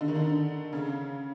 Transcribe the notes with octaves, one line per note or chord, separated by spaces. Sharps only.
D3
D#3
D3
C#3